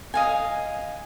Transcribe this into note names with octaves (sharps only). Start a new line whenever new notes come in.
D#5 F5 G#5